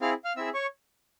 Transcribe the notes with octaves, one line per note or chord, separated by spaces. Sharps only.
C4 E4 G#4 F5 F6
F5 F6
C4 E4 G#4 E5 E6
C#5 C#6